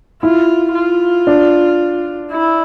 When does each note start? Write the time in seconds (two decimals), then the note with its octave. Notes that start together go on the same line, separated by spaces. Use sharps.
0.23 E4 F4
0.75 F4
1.27 D4
2.32 E4